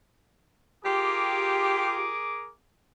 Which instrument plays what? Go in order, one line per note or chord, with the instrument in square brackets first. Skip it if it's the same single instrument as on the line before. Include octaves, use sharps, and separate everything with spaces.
[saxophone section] F4 G4 [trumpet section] G#4 A#4 D6